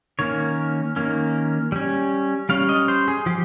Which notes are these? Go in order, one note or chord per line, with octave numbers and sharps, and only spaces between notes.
D#3 A#3 C#4 C#5
D#3 A#3 C#4
G3 C#4
G3 C#4 F5
D#5
C5
G#4
F3 G4